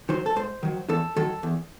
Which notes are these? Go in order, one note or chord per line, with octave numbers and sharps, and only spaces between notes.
D#3 F#3 C5
A4
G#2 C5
D#3 F#3
E2 A4
D#3 F#3 A4
E2